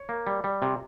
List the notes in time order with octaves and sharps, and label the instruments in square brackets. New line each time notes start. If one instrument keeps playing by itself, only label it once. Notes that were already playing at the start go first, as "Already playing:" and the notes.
Already playing: [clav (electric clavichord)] C#5
A#3
G3
G3
C3